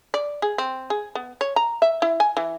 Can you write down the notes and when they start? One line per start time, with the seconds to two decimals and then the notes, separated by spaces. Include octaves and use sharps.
0.14 D5
0.42 G#4
0.58 C4
0.90 G#4
1.15 B3
1.41 C#5
1.56 A#5
1.82 E5
2.02 E4
2.20 G#5
2.37 E3